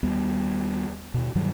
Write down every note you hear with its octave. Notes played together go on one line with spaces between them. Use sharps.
D#2 G3 B3
D#2 B2
G2 D#3 F#3 G3